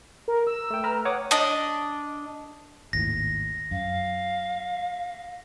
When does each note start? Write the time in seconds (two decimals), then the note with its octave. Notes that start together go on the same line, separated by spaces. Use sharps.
0.28 A#4
0.47 E6
0.70 A3 G5
0.84 B4 A#5 F6
1.05 C#5 F#5 D6 D#6
1.31 D4 D#5
2.93 G#1 D#2 A2 A#6
3.71 F#2 F5